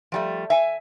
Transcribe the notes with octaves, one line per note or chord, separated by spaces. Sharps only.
F3 G3 A3
E5 G#5